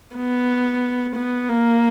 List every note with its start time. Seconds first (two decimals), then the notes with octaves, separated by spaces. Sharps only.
0.16 B3
1.16 B3
1.49 A#3